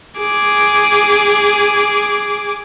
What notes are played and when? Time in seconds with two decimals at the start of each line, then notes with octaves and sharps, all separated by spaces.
0.18 G#4 D6